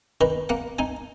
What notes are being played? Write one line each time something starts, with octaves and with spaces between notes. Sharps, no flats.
D#3 B4
A#3 F#5
D#4 G#5